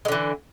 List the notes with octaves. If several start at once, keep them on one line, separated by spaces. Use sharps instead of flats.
D3 E3 G#3